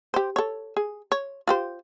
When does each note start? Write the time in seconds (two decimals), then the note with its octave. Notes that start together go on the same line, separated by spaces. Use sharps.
0.14 G4 C5
0.36 A4 C#5
0.77 G#4
1.12 C#5
1.47 F4 G4 C5